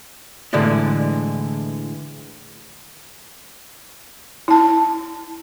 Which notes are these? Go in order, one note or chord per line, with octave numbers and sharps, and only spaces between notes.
A2 D3 E3 G#3 D4
E4 A5